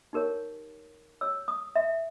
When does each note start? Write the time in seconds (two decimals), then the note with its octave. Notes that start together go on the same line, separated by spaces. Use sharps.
0.13 D#4 G4 A#4 C#5
1.21 G4 C#5 E6
1.48 D#6
1.76 E5